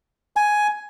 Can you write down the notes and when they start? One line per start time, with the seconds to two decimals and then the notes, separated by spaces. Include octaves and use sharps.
0.36 G#5